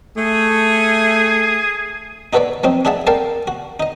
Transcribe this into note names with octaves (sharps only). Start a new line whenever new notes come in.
A3 G#4
D#4 F#4 A4 B4 C#5 D5
F3 F#3 C4 D#4
D4 D#4 G#4 E5 F#5 A5
A4 A#4 D5 F5 G5 A5
F#4
D#4 D#5